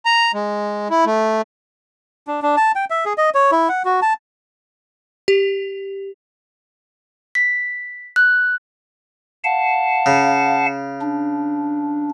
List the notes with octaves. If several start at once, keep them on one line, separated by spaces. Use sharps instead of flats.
A#5
G#3
E4
A3
D4
D4
A5
G5
E5
G#4
D#5
C#5
E4
F#5
F#4
A5
G4
B6
F#6
F5 F#5 A5
C#3
D4